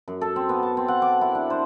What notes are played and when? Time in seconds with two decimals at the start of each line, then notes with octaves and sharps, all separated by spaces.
0.08 F#2
0.21 A4
0.36 C4
0.49 B3
0.63 A5
0.77 C4
0.88 F#5
1.02 D6
1.21 E4
1.35 D4
1.50 C5